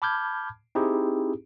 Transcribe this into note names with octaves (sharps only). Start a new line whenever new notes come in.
A5 B5 D6 F6 G6 G#6
C4 D#4 E4 G4 G#4